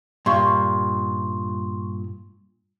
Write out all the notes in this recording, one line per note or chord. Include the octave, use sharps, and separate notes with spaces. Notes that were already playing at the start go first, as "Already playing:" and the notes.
G2 A#2 C6 C#6